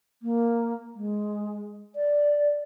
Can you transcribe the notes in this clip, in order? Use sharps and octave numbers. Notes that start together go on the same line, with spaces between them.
A#3
G#3
D5